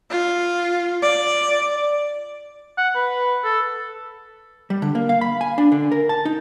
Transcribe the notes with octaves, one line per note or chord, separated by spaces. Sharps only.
F4
D5
F#5
B4
A4
G3
D3
A#3
F5
B5
G#5
D4
D3
A#4
A5
D#4